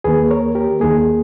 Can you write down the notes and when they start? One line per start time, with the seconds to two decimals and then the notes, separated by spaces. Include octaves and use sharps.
0.04 D#2 D#3 A#3 G#4 B4
0.30 A#4 C#5
0.55 G4 A#4
0.80 D#2 D#3 A#3 G#4